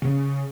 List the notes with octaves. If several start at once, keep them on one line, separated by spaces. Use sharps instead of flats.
C#3